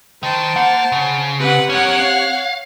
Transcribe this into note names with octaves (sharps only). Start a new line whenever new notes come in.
D#3 C5 A5
A#3 F#5
C#3
C4 G4 B4 F#5
C#4 A#4 C#5 F#5
F5